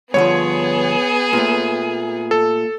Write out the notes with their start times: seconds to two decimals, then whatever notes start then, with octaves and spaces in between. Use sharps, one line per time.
0.14 G2 D3 F3 B3 G#4 C#5
1.33 A#2 A3
2.31 A4